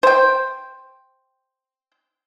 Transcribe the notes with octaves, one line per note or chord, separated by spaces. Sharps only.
C5 G5